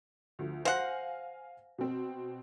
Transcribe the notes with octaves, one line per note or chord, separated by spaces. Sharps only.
D2 F3
C5 F5 F#5 G#5 A#6
B2 C4